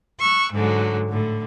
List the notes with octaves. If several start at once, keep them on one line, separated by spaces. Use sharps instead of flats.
C#6 E6 F#6
G#2 D3 F#3 G#3
A2 D3